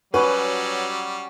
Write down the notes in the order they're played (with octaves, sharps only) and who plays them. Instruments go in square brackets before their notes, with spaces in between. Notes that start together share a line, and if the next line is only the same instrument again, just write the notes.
[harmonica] F#3 G3 [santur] C#4 F#4 [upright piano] B4